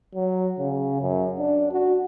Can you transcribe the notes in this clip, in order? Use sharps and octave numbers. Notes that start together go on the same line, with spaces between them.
F#3
C#3
F#2
D4
F#4